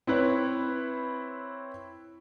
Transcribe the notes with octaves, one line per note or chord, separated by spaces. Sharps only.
C4 E4 B4 C#5